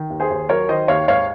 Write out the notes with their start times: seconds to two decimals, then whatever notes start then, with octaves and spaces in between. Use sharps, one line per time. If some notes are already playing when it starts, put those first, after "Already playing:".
Already playing: D#3
0.10 D#2
0.20 G#4 C5
0.30 D#2
0.49 F#3 A#4 C#5
0.69 D#3 C5 D#5
0.88 D#2 C#5 F5
1.08 G#2 C#5 F5